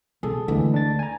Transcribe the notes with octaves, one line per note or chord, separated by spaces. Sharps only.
B2 G#4 A4
D2 D3 E3 G#3
D4 A6
G#5 A#5